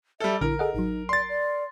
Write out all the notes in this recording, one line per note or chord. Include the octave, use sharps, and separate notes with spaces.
G3 A4 E5 F6
A#1 D3 E4 A#4
G#4 A4 D#5 F#5
A1 F#3 D#4
D5 C6 A6
D5